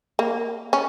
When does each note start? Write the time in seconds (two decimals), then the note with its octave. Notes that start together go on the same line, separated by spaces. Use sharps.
0.19 A#3
0.73 C#4